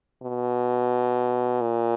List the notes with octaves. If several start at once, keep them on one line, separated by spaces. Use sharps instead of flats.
B2
A#2